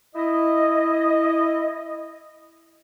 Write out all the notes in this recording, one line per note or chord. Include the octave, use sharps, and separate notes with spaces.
E4 D#5